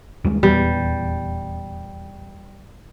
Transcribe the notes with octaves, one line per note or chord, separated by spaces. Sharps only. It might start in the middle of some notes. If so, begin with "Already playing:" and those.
D#2 G3 G#3
D#1 E2 G3 B3